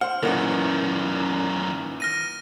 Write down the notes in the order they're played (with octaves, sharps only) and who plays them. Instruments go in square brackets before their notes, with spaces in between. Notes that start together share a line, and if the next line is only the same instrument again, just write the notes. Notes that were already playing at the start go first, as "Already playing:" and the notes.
[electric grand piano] C5 C6 [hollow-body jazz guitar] F#5 [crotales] F6
[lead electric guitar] F#2 D#3 [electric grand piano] A#2 E3 F#5 [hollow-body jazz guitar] C#4 D#4 A#4
[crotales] F6 A#6 D#7